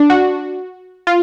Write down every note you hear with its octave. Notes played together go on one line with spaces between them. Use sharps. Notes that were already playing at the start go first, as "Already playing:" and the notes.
Already playing: D4
F#4
F4